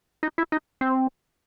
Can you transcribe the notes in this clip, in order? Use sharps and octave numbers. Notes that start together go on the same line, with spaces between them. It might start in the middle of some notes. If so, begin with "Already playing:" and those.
D#4
E4
D#4
C4